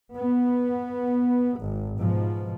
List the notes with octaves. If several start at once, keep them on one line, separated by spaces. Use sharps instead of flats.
B3
G#1
G#2 B2 F3